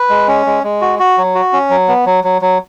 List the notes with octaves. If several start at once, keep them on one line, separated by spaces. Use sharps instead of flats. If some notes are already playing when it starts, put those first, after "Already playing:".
Already playing: B4
G#3
C#4
G#3
G#3
F#4
F#4
F#3
F#4
C#4
F#3
B3
F#3
F#3
F#3